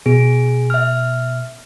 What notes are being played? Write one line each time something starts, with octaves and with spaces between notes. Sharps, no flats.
B2 G#4
E5 F6